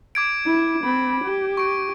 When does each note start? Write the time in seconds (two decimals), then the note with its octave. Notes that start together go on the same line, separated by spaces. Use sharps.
0.15 D6 G#6 D7
0.46 E4
0.84 C4 B5
1.24 G4
1.57 C#6 D7